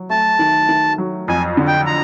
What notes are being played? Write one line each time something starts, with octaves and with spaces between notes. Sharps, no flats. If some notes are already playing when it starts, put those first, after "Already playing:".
Already playing: F#3
A3 A5
D#3
D#3
F#3
F2 G#5
D3
G5
A#5